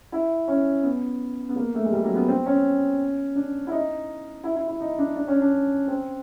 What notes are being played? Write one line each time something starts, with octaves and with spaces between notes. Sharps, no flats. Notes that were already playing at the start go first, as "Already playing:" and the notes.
E4
C#4
B3
B3
A#3
A3
G#3
G3
F#3
B3
C4
C#4
D4
E4
D#4
E4
E4
E4
D#4
D4
D4
C#4
D4
C4